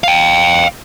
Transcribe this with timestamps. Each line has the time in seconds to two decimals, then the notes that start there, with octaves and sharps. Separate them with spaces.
0.04 F5 G5